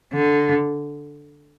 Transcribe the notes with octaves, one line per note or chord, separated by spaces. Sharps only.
D3